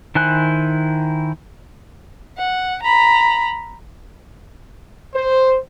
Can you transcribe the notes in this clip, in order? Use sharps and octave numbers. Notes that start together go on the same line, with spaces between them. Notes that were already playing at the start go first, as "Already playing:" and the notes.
D#3 E4 C5 G#5 F#6
F#5
A#5 B5
C5